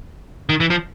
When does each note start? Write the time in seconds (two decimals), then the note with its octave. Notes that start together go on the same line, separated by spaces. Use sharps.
0.49 D#3
0.60 E3
0.70 F3